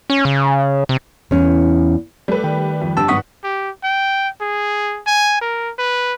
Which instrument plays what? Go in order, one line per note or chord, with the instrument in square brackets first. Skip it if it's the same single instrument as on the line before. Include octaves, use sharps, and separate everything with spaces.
[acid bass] C#4
C#3
C3
[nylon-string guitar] E2 C#4
[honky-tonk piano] G3 B4 [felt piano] A3
[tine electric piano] D#3 G5
[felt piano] F2
[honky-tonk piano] G1 G2 [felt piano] G4 [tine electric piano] A5 E6
[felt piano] G#1 G2 [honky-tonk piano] F#5 [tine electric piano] C#6 D#6 B6
[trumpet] G4
G5
G#4
G#5
A#4
B4